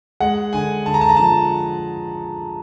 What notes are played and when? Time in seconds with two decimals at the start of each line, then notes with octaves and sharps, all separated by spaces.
0.20 G#3 F#5
0.53 D3 G#5
0.86 D3 A5
0.94 A#5
1.01 A5
1.09 A#5
1.17 F3 A5